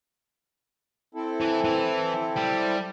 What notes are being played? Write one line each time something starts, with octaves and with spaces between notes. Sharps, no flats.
C4 E4 A4
E3
E3
G3